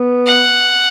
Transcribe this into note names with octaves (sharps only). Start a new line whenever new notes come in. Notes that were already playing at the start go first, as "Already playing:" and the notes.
Already playing: B3
F#5